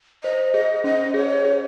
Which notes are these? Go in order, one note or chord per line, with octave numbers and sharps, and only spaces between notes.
C5 D#5
G#4 D#5
C#4 D#5
G#4 C#5
G#4